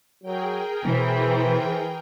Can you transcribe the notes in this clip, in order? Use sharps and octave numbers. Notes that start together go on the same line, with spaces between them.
F#3 G#4 A#4 G5
B2 E3 C5